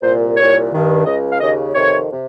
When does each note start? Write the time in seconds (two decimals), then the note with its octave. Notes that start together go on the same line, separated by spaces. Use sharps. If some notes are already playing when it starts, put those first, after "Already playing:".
0.02 C2 A#2 C5
0.37 C2 A#2 C#5
0.72 G2 D#3
1.06 C#2 C#3 D#5
1.32 F5
1.40 D#2 C#3 D#5
1.74 F2 C3 D#3 C#5
2.11 C3